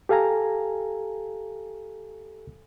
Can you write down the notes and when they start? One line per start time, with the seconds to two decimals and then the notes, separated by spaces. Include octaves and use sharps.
0.09 G4 A4 F5 G#5 A#5